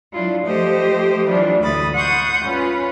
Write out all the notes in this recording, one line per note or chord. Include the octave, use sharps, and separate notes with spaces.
F#3 D4 E4 F4
F3 A3 G4 C5 D#5
E3 F#3 D4 F4
D2 E3 B5 D#6 A6
F#5 C6 C#6 D#6 G6
C#4 F4 B4